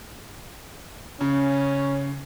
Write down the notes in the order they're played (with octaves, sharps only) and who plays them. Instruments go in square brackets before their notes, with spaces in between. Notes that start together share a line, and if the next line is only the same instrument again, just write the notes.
[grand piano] C#3 [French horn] C#4